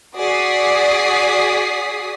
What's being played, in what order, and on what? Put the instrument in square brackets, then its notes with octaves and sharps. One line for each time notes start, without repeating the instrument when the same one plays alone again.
[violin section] F#4 G#4 D5 D#6 B6 C7